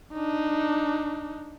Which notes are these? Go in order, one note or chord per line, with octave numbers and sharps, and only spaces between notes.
D4 D#4